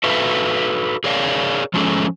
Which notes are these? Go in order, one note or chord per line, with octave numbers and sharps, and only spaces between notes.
F#4 A4 B4 E5 F5
G#4 A#4 C#5 D5 F5
F3 F#3 G#3 C#4 G#4 A4